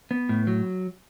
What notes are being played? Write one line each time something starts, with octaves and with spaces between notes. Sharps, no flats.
B3
A2
F#3